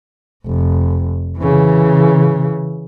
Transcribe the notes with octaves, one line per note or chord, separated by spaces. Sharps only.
F1
C#3 E3